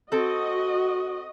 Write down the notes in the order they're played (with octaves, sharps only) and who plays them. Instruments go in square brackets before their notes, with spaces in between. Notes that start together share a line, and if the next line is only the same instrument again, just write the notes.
[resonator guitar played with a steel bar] C4 A4 [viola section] F#4 D#5